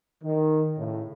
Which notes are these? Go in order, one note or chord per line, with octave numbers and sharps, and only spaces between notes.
D#3
A2 C#3